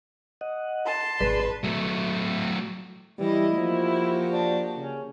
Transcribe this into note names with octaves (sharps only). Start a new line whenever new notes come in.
D#5 F#5
A5 C6
G#1 E3 G#4 B4 D5
F#3 A3
E3 G3 E4 D#5
F3 A#3 F#4 G4
D4
C#3 C#4